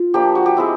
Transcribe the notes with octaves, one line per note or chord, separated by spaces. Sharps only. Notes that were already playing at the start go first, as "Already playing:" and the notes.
Already playing: F4
F3 A#3 D4 G4
F#4
G4
G#3 C4 E4